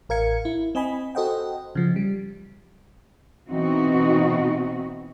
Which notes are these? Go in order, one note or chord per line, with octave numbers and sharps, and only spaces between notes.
A1 A#4 F5 G#6 C#7
E4
C4 D#5 G#5 B5
F#4 A4 C5 D#5 F#5 G5
C#3 F3
G3
B2 E3 C4 D#4 F#4